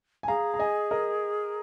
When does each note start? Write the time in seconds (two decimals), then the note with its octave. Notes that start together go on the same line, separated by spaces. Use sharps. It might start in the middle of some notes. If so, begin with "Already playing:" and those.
0.23 G#5
0.28 G#4 F5 A#5
0.54 A#5
0.59 D#5 G#5
0.91 A#4 D#5